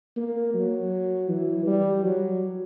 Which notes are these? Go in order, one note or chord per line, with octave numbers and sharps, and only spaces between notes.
A#3
F#3
E3
G3
F#3